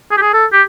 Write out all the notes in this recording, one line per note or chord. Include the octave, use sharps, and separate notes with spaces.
G#4
G4
G#4
A4
G4